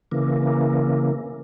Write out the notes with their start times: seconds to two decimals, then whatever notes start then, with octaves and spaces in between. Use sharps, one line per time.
0.12 C#3 E3 A#3